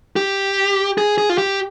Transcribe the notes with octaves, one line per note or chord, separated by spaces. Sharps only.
G4
G#4
G#4
F4
G4